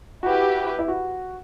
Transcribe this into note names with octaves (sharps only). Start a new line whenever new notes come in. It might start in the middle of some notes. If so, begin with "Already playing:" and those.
E4 F#4 G4 B4
E4
F#4